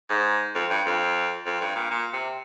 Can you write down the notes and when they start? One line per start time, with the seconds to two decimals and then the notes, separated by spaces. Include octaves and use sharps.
0.10 G#2
0.55 F2
0.70 G2
0.86 F2
1.46 F2
1.61 G2
1.75 A#2
1.91 A#2
2.13 C3